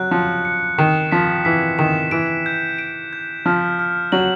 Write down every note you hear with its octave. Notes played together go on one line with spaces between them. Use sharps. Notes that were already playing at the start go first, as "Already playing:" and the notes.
Already playing: F#3 F#6
F3 C#7
C#7
D#3 E7
F3 B6
E3 B6
D#3 E7
E3 D7
G6
D7
G6
F3 F6
F6
F#3 F#7